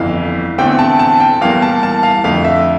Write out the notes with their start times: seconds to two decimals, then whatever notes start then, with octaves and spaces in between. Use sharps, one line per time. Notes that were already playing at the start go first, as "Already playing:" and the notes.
Already playing: G1 F2 E3 F5
0.58 E2 D3 A3 C4 G5
0.79 A5
0.99 A5
1.20 G5
1.41 E2 E3 G3 A#3 F5
1.62 A5
1.83 A5
2.03 F5
2.24 F2 D3 A3 F5
2.45 E5